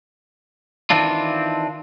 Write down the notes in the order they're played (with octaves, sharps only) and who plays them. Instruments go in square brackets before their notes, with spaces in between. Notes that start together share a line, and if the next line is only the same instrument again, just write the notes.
[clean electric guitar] D#3 E3 C4 D4 F4